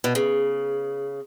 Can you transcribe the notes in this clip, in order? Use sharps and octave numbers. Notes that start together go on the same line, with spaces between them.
B2
C#3